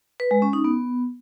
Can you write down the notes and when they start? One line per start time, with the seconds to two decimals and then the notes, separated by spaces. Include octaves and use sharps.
0.20 B4
0.31 G#3
0.42 C#4
0.53 D#4
0.64 B3